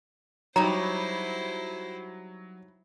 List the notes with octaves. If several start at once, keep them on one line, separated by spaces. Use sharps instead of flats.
F#3 G3 D#4 E4 C5 C#5 A#5